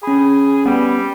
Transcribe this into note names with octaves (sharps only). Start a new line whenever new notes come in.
C#4 G#4 B5
G3 B3